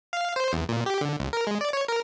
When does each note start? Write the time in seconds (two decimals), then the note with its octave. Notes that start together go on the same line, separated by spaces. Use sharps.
0.13 F5
0.36 C5
0.53 E2
0.69 A#2
0.86 G4
1.01 D3
1.20 C#2
1.33 A#4
1.47 G#3
1.61 D5
1.73 C#5
1.88 A#4